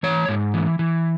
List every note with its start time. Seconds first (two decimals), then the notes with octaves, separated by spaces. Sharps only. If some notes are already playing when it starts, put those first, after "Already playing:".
0.03 E3 C#5
0.29 G#2
0.54 E3
0.79 E3